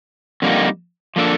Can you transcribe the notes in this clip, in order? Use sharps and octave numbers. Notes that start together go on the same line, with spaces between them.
F2 D3 G3 A#3 D#4
F3 A#3 D4 A4